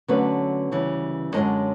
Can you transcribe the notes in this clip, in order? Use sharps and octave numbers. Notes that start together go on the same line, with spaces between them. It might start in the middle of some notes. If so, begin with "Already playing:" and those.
D3 F#3 A3 B3 C#4 B4
D2 C#3 E3 G3
F#2 D3 F3 G#3 C#4 D#4 D#5